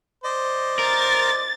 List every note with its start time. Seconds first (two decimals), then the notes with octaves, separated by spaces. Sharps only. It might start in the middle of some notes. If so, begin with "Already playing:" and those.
0.24 C5 D5 D#5
0.79 A#4 A6